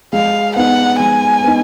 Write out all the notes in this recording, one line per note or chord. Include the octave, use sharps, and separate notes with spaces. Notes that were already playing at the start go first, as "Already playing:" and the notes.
G#3 F5
B3 D#4 F#5
G#3 G#5
B3 D#4